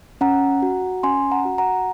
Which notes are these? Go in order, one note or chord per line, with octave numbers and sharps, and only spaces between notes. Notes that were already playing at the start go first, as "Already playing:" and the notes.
C#4 F#5 A#5
F#4
C#4 G#5 C6
F#5 A#5
F#4
F#5 A#5